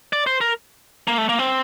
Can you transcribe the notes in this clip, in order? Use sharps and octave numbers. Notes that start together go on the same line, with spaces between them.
D5
C5
A#4
A#3
A3
A#3
C4